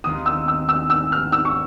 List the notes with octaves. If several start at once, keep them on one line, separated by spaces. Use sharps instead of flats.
D#2 D#3 G#3 C4 F4 D#6
E6
E6
E6
E6
F6
E6
C#6